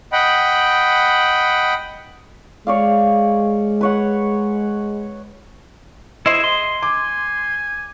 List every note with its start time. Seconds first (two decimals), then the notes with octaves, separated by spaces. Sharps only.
0.12 D#5 F#5 G5 B5
2.67 G#3 C#5 D5 F5
3.81 B4 C#5 F#5
6.26 E4 G#4 C5 D#5
6.44 C6
6.82 G#5 D6